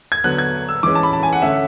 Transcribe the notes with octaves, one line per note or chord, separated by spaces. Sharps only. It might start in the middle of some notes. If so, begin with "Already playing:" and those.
G#6
D3 F#3 B3 F#6
G#6
E6
E3 G#3 C#4 D6
A5
B5
A5
G#5
F#5
D3 A3 C#4 E5